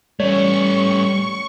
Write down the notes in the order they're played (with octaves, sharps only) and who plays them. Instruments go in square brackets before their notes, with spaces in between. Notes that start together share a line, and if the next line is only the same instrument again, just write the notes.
[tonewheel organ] G3 [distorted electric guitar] A3 C#4 [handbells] C#5 [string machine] C#6